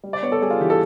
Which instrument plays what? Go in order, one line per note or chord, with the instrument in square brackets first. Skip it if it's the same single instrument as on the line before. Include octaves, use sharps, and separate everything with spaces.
[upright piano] G3
D5
B3 C#5
A4
G3 G#4
F4
E3 G4
A4